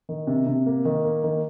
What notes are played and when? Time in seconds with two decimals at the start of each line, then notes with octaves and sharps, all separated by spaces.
0.09 D#3
0.27 C3
0.47 C3
0.66 A#3
0.85 D#3
1.04 A#3
1.24 D#3